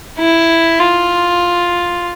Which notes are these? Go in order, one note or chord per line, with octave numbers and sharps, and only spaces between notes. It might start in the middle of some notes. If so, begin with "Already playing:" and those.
E4
F4